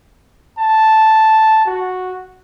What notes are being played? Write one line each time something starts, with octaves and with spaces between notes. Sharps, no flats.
A5
F#4